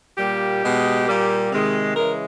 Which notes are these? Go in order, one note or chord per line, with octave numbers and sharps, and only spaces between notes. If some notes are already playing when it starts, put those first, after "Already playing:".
A#2 G3 A#3 G4
B2 G#3
A#2 G3 A#3
C3 D#3 G#3
C#3 E3 G#3 A#4